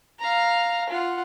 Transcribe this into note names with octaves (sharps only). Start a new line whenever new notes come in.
F5 A#5
F4 F#5